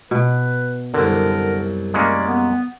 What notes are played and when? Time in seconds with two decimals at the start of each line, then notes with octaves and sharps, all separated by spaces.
0.11 B2 B4
0.94 C2 F#2 D3 A#4
1.94 G#3 A#3 C#4 D5
2.27 B3